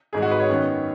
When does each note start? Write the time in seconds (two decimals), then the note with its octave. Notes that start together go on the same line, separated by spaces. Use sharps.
0.13 G#1 G#2 G#3 G#4
0.22 F#4
0.31 B4
0.40 C#5
0.50 F#2 D#3 B3